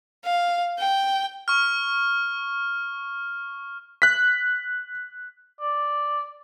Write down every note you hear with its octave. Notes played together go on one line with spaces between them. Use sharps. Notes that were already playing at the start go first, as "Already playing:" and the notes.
F5
G5
C#6 F6
F#6 B6
D5